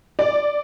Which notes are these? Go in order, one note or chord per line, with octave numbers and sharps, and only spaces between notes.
D5